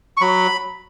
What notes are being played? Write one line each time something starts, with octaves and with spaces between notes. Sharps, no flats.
C#6
F#3 B5